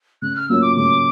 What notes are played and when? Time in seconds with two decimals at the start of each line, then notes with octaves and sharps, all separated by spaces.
0.22 C#3 F#6
0.36 F6
0.49 F#3 A#3 C#4 F4 E6
0.62 D6
0.77 C#3 D6